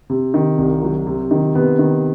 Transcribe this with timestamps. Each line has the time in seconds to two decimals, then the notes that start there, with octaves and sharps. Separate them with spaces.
0.10 C3
0.34 D#3
0.58 C2
0.82 F#3
1.07 C3
1.31 D#3
1.55 C3 B3
1.79 D#3